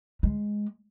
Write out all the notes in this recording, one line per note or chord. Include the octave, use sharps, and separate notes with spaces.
G#3